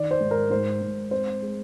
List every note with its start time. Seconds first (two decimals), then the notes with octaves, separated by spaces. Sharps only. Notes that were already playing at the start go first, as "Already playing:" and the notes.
Already playing: D#3 D5
0.11 C5
0.21 G#2
0.31 A#4
0.51 G#2 C5
0.82 G#2
1.11 C4 C5
1.42 G#3